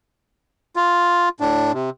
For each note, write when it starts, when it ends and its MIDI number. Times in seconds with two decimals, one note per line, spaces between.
0.76 1.29 65
1.40 1.72 45
1.40 1.72 62
1.74 1.90 48